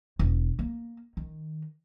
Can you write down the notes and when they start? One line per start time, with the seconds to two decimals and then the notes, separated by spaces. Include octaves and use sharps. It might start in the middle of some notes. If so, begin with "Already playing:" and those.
0.19 E1
0.59 A#3
1.17 D#3